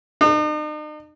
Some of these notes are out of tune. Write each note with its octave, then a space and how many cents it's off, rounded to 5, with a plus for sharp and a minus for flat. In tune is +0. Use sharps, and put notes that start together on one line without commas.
D#4 -45